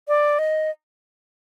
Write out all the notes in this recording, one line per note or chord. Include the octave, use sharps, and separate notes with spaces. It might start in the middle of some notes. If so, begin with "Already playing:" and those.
D5
D#5